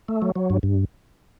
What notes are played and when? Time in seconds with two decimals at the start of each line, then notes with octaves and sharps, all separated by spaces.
0.08 A3
0.22 F#3
0.36 F#3
0.50 G2
0.63 G2